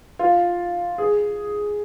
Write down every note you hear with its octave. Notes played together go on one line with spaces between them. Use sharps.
F4
G#4